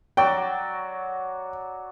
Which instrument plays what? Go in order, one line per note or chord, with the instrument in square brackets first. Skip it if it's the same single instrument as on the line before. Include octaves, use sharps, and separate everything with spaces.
[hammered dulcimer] F#3 F#4 D5 [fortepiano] G5